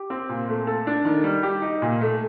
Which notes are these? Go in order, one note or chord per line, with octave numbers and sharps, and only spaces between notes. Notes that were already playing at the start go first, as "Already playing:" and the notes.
Already playing: G4
C4
A#2
A3
A4
D4
D#3
G3
G4
D#4
A#2
A3